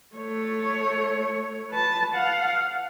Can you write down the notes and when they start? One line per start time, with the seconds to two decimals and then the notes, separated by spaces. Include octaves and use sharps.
0.16 A3 C#5
1.70 B4 A5
2.14 F5 F#5